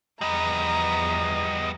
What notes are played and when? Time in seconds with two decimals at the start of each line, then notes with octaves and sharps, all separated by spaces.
0.21 E2 F3 G3 B3 D#5 A#5